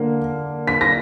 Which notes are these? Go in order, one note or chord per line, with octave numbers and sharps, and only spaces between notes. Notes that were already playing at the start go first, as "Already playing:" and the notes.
Already playing: D3 A#3
B6
A#6